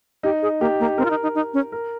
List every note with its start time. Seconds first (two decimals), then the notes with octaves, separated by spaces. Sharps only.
0.23 D#4 G4
0.42 G#4
0.61 A#3 G4
0.80 A#3
0.98 C4 A#4
1.05 F4
1.10 D#4
1.23 D#4
1.35 D#4
1.54 C#4
1.72 A#4